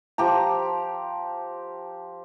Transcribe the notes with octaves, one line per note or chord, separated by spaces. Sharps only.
F3 G4 A#5